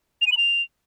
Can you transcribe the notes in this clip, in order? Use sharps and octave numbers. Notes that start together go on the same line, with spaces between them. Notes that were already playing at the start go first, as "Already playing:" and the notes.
F7
D#7
F#7
F7